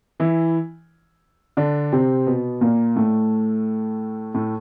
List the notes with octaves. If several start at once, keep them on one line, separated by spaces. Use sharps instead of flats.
E3 E4
D3 D4
C3 C4
B2 B3
A#2 A#3
A2 A3
A2 A3